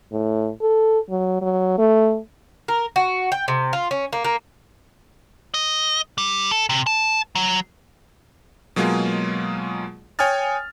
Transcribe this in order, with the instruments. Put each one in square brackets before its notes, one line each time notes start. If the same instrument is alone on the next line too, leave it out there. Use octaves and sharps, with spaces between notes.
[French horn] A2
A4
F#3
F#3
A3
[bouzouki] A#4
F#4
G5
C3
F4
C#4
A#3
A#3
[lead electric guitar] D#5
G3
A4
C3
A5
F#3
[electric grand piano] B2 F#3 G#3 A#3 F4 G#4
C#5 G5 G#5 D#6 F6 A6